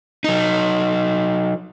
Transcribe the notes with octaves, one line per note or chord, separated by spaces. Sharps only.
F#3 D#4